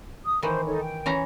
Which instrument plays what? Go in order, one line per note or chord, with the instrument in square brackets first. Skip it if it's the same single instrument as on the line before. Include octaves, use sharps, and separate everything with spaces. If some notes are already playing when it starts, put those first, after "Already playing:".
[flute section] D#6
[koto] D#3 E3 [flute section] C5
[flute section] D#4 A4 C#5
G5
[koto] E3 C#4 A#5